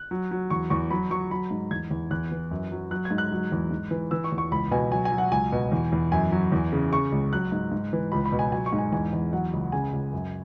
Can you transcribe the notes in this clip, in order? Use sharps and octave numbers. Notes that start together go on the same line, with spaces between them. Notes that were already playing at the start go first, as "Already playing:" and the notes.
Already playing: F#6
F#3
F#3
E2 C#6
E2 C#6
F#3 B5
F#3 C#6
F#3 B5
G#2
E2 G#6
E2
E2 F#6
E3
F#2
F#3
F#3 F#6
G#6
G#2
F#6
F#3
E2
G#2
E3
E3 E6
C#6
E2
C#6
C#2 B5
B2 G#5
F#3 G#5
G#5
F#3
F#5
C#2 G#5
B2
E2
E2
F#2 G#5
F#3
E2
C#3
C#3 C#6
C#2
F#3 F#6
G#2
G#2
E3
C#2 B5
B5
B2
G#5
F#3 G#5
C#6
G#2
G#5
E2 G#5
E2
F#3 F#5
C#2
C#3 G#5
C#2
F#2